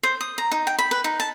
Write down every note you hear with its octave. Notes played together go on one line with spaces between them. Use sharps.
C5
D#6
A#5
D#4
G5
B5
B4
D#4
A5